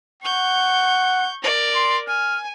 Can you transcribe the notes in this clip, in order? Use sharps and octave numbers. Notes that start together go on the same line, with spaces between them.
F#5 C#6 G6
A#4 D5
C6
G#5 F6